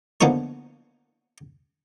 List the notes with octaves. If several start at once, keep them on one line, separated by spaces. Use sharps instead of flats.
D3 F3 A#3 B3 D#4 C#5